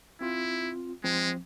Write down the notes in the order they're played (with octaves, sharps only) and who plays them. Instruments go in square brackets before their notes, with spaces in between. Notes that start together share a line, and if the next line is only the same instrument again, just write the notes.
[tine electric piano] C4 F4 [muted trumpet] E4
[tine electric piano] F3 C4 [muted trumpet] G#3